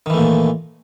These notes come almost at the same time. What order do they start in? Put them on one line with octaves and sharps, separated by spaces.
D#3 E3 A3 A#2